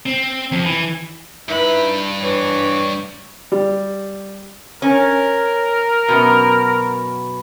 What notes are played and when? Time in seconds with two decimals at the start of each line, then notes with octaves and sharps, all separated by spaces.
0.06 C4
0.52 F2
0.64 E3
1.49 G2 D#4 E4 B4 B5
2.21 E3 C#5
3.52 G3
4.82 C#4 A#4
6.08 F#2 B2